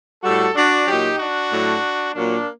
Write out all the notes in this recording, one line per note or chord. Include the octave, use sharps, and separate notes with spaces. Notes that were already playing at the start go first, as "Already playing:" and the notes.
A2 G3 F#4 A4
D4 F#4
A#2 F#3 D#4 G4
D4 F#4
A2 F#3
A#2 F#3 A#3 D4